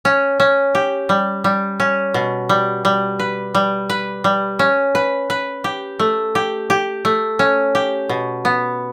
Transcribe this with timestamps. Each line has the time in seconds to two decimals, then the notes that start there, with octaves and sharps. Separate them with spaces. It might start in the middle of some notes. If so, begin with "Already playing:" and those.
0.05 C#4
0.40 C#4
0.75 G4
1.09 G3
1.44 G3
1.80 C#4
2.14 B2
2.49 G3
2.85 G3
3.19 B4
3.55 G3
3.89 B4
4.24 G3
4.59 C#4
4.95 B4
5.30 B4
5.64 G4
5.99 A3
6.35 G4
6.70 G4
7.05 A3
7.39 C#4
7.75 G4
8.09 B2
8.45 B3